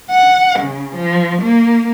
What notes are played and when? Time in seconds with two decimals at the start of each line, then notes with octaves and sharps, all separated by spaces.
0.11 F#5
0.60 C#3
0.96 F3
1.42 A#3